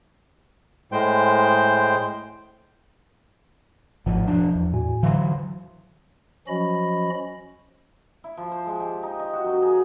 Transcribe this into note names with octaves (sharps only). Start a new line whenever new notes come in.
A2 G#3 C5 G5
G#1 A2 F3 F#5
E1 F3 D4
E2
A2 F#4 G#5
D3 E3 F#3 F5 C6
F3 F#3 C#4 F#4 D#5 B5
E4
F3
C5
G#3
G4
D#4
D#5
F#4
F#2
G#4